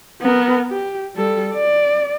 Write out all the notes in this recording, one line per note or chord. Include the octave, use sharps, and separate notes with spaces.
B3 A#4
G4
G3 A4
D5